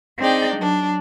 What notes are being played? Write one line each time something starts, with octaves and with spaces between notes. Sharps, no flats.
C4 D4 D#4 G#4 D5 G5
F#3 D4